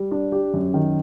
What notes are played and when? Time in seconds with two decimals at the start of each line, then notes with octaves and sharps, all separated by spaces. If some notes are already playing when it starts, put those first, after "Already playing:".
Already playing: G3
0.11 D4
0.32 G4
0.53 F#2
0.74 D#3